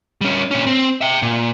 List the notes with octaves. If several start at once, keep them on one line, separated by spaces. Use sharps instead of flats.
G3 C#4
A#2 C#4
C4
E5 G5
A#2